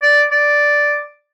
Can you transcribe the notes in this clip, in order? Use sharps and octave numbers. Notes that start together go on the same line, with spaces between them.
D5
D5